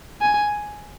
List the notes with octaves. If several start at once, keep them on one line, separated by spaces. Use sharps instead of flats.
G#5